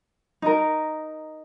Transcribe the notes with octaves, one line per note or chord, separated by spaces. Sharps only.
D#4 A#4